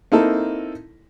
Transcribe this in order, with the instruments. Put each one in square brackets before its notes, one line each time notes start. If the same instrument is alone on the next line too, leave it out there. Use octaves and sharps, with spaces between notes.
[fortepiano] A#3 C4 D#4 E4 A4